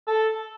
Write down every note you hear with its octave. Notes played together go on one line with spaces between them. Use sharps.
A4